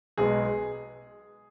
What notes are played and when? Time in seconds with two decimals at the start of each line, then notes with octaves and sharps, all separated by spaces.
0.18 B1 B2 G#3 B3 G#4